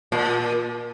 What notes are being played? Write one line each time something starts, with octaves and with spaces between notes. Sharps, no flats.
A#2